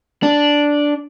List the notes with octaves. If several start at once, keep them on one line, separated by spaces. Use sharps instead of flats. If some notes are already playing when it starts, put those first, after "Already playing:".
D4